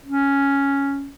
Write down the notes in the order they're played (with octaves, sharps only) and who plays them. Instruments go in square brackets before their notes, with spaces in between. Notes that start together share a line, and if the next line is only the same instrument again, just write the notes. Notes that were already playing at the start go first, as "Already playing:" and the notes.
[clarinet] C#4